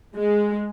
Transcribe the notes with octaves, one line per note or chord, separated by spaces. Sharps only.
G#3